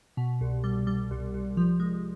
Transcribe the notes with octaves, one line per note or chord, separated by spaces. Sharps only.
B2
C2
G3
G3
C2
C2
F3
G#3